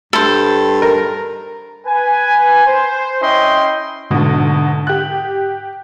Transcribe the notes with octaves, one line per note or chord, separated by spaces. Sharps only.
G2 A4 C5
A#4
B4 G#5
C5
C#4 E4 D#5 G5 C6
D2 G#2 B2 D3
G4 F#6